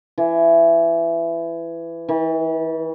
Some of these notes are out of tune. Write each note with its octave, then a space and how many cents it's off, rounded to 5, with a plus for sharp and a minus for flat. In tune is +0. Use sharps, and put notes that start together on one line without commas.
E3 +20
E3 -35